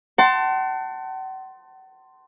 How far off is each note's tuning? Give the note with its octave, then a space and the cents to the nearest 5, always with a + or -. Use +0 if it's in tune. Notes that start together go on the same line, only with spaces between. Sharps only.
F#5 +45 A5 +20 C6 +0